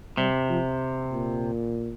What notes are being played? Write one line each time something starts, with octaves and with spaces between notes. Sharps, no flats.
C3 G3
F3
A#2